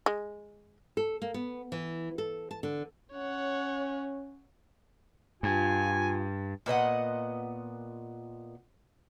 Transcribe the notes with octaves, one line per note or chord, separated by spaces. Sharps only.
G#3
A4
A#3
B3
E3
A4
A5
D3
C#4 C#5 F#5
G2 F4 G#5
A#2 B3 D#5 F#5